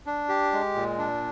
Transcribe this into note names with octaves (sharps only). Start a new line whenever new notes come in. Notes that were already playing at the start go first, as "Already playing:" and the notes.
D4
G4
G#3
A#2
D4